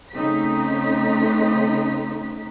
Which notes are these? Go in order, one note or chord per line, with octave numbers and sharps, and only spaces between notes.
C#3 A3 C4 D#4 A#5 B6